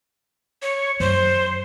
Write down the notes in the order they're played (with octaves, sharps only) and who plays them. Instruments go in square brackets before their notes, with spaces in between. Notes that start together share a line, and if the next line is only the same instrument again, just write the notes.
[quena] C#5
[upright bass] F#2 [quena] C5